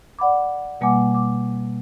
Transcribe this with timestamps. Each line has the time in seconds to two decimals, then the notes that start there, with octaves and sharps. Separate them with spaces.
0.19 D5 F#5 B5 D6
0.81 B2 G3 A#3 F#5 G#5 D6
1.14 D6